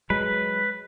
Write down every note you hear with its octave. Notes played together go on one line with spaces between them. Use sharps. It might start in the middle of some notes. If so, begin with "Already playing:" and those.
F#3 G#3 B4